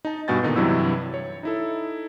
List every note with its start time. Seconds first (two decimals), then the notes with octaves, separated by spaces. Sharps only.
0.05 D#4 A5
0.28 G2 B2 F#4 G#5 G6 A6
0.43 A#2 D3 D#3 B3 D#4
0.56 G2 C3 E3 F#3 E4 E6
1.14 C#5
1.43 D#4 E4 A4